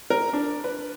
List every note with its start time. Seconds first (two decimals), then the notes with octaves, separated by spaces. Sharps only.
0.10 A#4
0.33 D4
0.64 B4